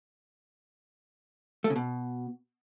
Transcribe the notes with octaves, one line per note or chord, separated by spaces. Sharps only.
A3
C#3
B2